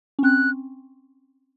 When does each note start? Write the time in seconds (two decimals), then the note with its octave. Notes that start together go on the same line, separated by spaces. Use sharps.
0.19 C#4
0.23 C4 F#6